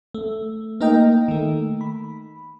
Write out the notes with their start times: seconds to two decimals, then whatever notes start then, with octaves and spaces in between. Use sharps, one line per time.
0.14 A3
0.81 A#3 D#4 A#4 D#5 G5
1.28 D#3 A3
1.81 B5